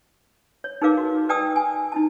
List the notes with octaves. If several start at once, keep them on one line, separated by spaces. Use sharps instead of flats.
C#5
D#4 G#4 A#4 B4 F5 D6
F#4
B4 D5 G5 A5 D#6 E6
G#5
D#4 E4 A5